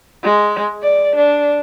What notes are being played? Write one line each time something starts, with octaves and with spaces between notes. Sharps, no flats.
G#3
D5
D4